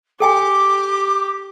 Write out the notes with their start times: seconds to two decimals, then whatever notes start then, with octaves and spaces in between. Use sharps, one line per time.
0.20 G4 A4 G5 G#5 D6